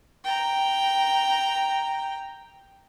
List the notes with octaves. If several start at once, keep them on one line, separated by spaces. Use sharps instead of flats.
G5 A#5